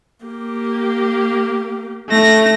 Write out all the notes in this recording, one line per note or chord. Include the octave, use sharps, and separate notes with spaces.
A#3 G4
A3 A#6